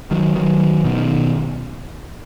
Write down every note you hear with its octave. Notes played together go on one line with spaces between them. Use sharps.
D#3 F#3
D#3 F#3
B2 D#3